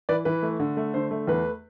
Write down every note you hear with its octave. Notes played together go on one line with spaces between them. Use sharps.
E3 B4 D5
E3 B4
A3
D3
A3
D3 C5
A3
E2 B4